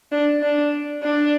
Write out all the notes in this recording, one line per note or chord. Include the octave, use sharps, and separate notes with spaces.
D4
D4
D4